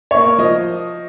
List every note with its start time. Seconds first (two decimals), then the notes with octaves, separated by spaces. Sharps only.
0.11 A#3 C#5
0.38 F3 D#5